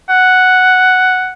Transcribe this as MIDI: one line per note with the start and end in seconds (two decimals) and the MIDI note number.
0.09 1.33 78